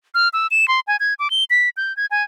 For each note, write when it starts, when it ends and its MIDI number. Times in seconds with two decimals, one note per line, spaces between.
0.15 0.29 89
0.33 0.47 88
0.51 0.68 100
0.68 0.80 84
0.87 0.97 80
1.00 1.14 92
1.19 1.30 86
1.30 1.44 103
1.50 1.69 95
1.77 1.95 91
1.97 2.06 92
2.11 2.23 80